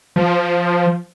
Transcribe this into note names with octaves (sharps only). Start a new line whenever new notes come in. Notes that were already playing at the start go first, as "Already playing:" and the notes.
F3